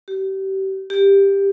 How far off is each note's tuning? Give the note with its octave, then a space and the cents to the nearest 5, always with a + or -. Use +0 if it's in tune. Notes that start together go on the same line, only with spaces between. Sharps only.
G4 -30
G4 +10